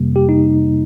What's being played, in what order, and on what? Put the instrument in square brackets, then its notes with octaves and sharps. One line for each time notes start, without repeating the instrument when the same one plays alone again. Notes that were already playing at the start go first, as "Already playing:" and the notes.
Already playing: [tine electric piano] F2 C3 G3 A#3
G4
D#4